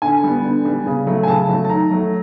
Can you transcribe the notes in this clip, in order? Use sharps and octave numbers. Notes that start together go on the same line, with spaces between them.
D3 G#5
G3 B3
D3
G3 B3
C#3
F#3 A3
G#5
C#3 A5
F#3 A3
A5
D#3 A#5
F#3 A3